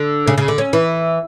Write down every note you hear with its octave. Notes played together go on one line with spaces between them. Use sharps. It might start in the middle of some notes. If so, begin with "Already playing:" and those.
Already playing: D3
C#3
C#3
D3
C#4
E3